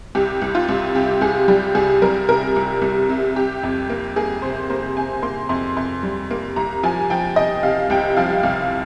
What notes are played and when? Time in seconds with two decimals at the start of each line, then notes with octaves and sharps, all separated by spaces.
0.15 C2 G4
0.42 C2
0.55 F4
0.69 C2
0.95 C3 G4
1.21 C2 G#4
1.48 G3 G4
1.75 C2 G#4
2.02 G3 A#4
2.28 C3 A#4
2.56 C2
2.82 C2
3.09 C3
3.36 C3 G4
3.63 F2
3.90 A#3
4.16 A#3 G#4
4.42 C3 C5
4.70 A#3 C5
4.96 C3 G#5
5.22 A#3 C6
5.49 F2 C6
5.77 F2 C6
6.03 G3
6.31 A#3
6.56 C2 A#5
6.83 F3 G#5
7.10 F3 G5
7.36 C3 D#5
7.63 C3 F5
7.90 C2 G5
8.17 F3 F5
8.43 C2 F5